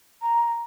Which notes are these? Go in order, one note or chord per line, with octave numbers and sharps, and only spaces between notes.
A#5